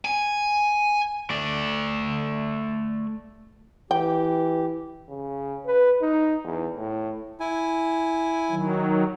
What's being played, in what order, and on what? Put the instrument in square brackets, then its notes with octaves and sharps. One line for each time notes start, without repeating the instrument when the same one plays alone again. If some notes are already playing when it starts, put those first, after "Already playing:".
[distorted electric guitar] G#5
[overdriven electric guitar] A3 D5
[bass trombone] E3 [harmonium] G4 [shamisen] G5
[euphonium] C#3
B4
D#4
E2
A2
[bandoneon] E4 G#5
[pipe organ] D#3 F#3